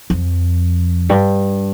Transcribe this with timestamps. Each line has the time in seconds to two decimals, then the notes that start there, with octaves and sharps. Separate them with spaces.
0.10 F2
1.09 G2